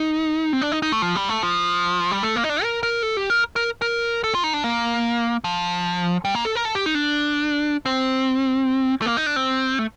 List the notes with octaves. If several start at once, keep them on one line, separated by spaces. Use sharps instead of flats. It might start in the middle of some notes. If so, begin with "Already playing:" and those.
Already playing: D#4
C4
D4
D#4
D#4
A3
F3
G3
A3
F3
G3
A3
A#3
D#4
D4
A#4
A#4
A4
G4
A#4
A#4
A#4
A4
F4
D#4
D4
A#3
F3
G3
A#3
A4
A#4
A4
G4
D#4
D4
C4
A3
A#3
D#4
D4
C4
A3